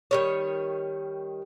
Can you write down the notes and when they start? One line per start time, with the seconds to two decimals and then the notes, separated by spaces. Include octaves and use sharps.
0.11 D#3 G3 C#5